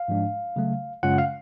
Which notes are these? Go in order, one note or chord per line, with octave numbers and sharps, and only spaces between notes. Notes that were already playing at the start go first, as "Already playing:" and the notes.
Already playing: F5
G#2 F3 G#3 D4
C#3 F#3 A3
F#2 C#3 G#3 C#4 F4 F#5
F5